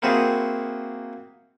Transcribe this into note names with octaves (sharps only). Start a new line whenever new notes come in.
A#3 C4 E4 F#4 G#4